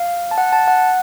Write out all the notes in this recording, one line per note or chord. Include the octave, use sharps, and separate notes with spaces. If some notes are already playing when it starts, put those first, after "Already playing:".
Already playing: F5
A5
F#5
A5
F#5